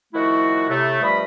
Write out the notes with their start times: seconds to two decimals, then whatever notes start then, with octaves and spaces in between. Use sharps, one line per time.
0.14 D#3 F3 A3 E4 F#4
0.69 A2 C3 A3
1.01 G2 F3 G3 A3 D#5 B5